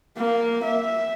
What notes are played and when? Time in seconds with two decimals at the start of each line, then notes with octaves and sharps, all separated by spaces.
0.17 A#3
0.64 E5